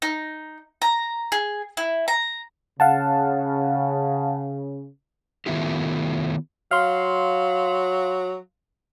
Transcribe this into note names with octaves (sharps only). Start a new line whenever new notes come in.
D#4
A#5
G#4
E4
A#5
C#3 F5 F#5 A5
D#3 A3 B3 E4 F4 G4
F#3 F5 C6